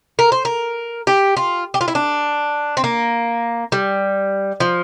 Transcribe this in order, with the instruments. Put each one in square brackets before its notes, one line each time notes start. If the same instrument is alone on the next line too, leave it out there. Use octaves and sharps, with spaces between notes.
[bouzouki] A#4
C5
A#4
G4
F4
G4
F4
E4
D4
C4
A#3
G3
F3